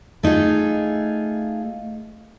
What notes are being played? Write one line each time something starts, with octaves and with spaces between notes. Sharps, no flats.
A3 D#4 F4 G#4